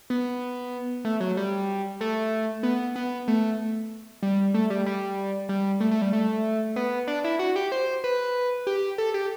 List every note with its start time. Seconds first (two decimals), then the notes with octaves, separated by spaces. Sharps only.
0.10 B3
1.05 A3
1.20 F#3
1.37 G3
2.01 A3
2.63 B3
2.96 B3
3.28 A3
4.23 G3
4.54 A3
4.70 G3
4.86 G3
5.49 G3
5.80 A3
5.91 A3
6.02 G3
6.13 A3
6.76 B3
7.08 D4
7.24 E4
7.39 F#4
7.56 G4
7.72 C5
8.04 B4
8.67 G4
8.98 A4
9.14 G4